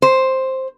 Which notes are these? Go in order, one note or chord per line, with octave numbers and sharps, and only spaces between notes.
C5